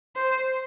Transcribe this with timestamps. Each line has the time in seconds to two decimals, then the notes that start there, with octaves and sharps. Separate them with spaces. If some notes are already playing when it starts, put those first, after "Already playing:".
0.16 C5